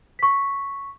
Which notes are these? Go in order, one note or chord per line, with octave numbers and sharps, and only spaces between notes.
C#6 B6